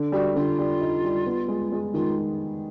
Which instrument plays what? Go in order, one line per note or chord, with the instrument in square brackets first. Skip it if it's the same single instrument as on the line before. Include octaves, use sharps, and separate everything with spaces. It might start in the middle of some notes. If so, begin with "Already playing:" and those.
Already playing: [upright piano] D3
[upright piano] G3 [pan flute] F#4
[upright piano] D3 [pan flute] F4
[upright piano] G3
D#4
G3
B3
G#3
G#3
[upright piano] D#3 [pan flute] F4